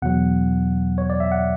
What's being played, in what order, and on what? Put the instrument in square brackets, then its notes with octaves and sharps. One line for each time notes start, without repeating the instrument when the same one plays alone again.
[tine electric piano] E2 B2 F#3 F#5
C#5
D5
E5
F#5